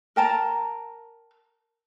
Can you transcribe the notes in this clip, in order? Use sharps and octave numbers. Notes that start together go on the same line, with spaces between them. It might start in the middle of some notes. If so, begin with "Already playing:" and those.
A#4 G5 A5 A#5